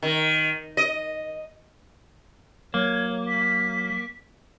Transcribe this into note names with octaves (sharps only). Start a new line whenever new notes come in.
D#3
D#5
F#3 A#3 C#5
B6